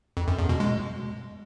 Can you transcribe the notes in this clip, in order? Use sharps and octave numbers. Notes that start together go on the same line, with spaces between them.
F2
F#2
E2
B2
G#3